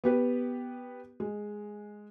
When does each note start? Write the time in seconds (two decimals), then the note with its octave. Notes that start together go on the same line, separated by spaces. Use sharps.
0.04 B3 G4 B4
1.20 G#3